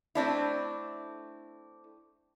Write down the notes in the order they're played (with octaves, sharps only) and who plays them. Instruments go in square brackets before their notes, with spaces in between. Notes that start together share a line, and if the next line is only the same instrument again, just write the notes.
[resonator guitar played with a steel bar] A3 C4 D4 E4